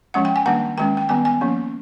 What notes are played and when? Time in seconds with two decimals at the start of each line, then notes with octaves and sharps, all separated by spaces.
0.14 F3 G#3 C#4 F#5
0.25 G5
0.36 G#5
0.46 D#3 G3 A#3 D4 F#5
0.78 D#3 G#3 C#4 G5
0.97 G5
1.09 D#3 G3 B3 G#5
1.25 G#5
1.41 F3 A#3 C#4